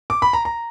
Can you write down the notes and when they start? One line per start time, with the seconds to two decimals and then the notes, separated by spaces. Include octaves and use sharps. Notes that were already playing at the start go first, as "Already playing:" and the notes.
0.10 D6
0.22 B5
0.33 A#5
0.45 A#5